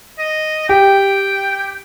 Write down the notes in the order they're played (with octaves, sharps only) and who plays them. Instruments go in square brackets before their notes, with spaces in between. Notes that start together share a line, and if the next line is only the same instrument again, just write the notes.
[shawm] D#5
[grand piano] G4 [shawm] G5